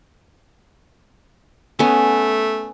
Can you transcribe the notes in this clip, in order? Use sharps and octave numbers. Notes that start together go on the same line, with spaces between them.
A3 B3 C#4